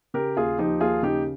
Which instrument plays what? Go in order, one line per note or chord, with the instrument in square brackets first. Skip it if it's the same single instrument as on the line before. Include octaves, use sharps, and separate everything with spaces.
[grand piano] C#3 G4 A#4
D#2 F4 G#4
F3 D#4 G4
D#2 F4 G#4
C#3 D#4 G4